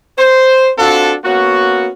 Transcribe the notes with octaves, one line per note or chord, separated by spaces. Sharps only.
C5
C4 D4 F4 F#4 A4
A#3 B3 C#4 F#4